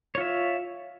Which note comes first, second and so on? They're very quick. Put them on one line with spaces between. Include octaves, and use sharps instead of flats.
C#5 F4 E5